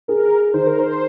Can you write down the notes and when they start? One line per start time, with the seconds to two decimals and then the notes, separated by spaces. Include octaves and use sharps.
0.08 G#4 A#4
0.54 D#3 C5
0.66 A#4
0.79 C5